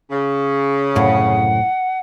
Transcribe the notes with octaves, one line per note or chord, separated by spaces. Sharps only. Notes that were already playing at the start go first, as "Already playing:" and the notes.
C#3
C2 F#2 A2 F#5